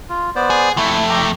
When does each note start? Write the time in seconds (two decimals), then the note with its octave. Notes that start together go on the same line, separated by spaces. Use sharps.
0.10 F4
0.36 B3 C5 D5
0.50 G#4
0.77 F2 A3 E4
1.10 G5 A#5 D6